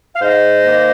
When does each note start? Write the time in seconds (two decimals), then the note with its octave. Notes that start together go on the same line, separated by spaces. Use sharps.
0.15 F5
0.21 G#2 C5 D#5
0.65 D#3 A#3